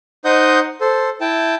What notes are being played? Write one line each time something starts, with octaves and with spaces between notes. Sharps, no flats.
D#4 C5 D#5 F#5 D#6 G6
A4 C5
E4 G5 A5